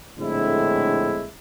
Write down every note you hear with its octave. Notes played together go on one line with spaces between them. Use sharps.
A#1 A2 D3 G#3 C4 E4